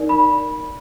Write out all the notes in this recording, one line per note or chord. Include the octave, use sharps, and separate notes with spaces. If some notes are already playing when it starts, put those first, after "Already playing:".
Already playing: D#4 A#4 D5
B5